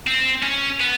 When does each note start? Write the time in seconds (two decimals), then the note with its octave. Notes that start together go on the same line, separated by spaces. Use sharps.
0.07 C4
0.43 C#4
0.80 B3